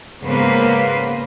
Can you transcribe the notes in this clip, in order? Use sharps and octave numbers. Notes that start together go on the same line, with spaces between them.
G#2 C#3 A#3 B3 B4 C5